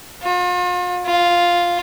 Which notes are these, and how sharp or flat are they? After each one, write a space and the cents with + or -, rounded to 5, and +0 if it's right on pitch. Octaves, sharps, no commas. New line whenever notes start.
F4 +40
F4 +0